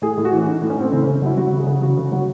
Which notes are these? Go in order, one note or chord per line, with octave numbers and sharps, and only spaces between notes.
A2 G#4
A2
F#4
E3
C#4
E3 D#4
A2
C#4
A2 C4
C#3 C4
C#4
C#3
F#3 E4
F#3 F#4
C#3
G#4
C#3
C#3 F#4
C#3
F#3